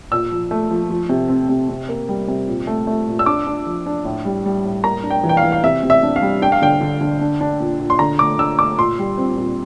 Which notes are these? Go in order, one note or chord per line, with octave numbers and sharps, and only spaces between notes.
A#2 E6
F3
A3
F3
F3
C3
C4
C3
C3
A#3
G3
C3
A#2
A3
A3
A#2
E6
D4 D6
D4
F3
D4
A2
G3
G3
A2
A#3 A#5
D4
G5
E3
G5
F5
E3
F5
C3 E5
C3
E5
D4
F5
G3
D4 G5
F5
D3 G5
D3
D3
D4
D4
A#2
A#2
C6
D3 A#5
A3 D6
D3 E6
A3 D6
A#2 C6
G3
C4
A#2